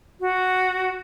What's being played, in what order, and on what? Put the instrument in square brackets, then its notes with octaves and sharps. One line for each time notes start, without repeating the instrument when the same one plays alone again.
[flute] F#4